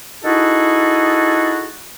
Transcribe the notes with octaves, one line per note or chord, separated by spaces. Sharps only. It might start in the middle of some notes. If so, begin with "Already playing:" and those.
D#4 E4 F#4 G#4 A4